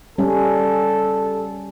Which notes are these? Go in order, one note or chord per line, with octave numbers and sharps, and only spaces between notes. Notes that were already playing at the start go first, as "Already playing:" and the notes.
G3 C#4 A4